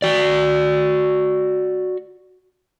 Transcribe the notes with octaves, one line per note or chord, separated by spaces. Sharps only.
F#4 D5